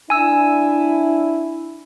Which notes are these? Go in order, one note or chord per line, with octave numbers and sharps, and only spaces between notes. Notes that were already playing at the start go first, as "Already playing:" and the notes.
D4 E4 G#5 E6